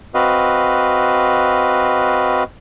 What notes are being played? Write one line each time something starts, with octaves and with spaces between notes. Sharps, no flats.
C4 F#4 B4 D#5 F5